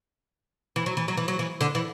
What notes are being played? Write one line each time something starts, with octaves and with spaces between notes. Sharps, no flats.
E3
F#3
E3
F#3
E3
F#3
E3
D3
E3